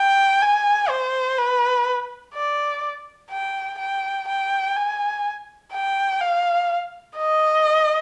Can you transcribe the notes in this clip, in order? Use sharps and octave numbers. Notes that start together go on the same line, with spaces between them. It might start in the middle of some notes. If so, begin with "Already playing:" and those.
Already playing: G5
G#5
C5
B4
D5
G5
G5
G5
G#5
G5
F5
D#5